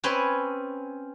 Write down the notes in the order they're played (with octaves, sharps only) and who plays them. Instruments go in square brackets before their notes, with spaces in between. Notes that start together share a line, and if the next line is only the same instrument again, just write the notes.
[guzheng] C4 C#4 B4 G#5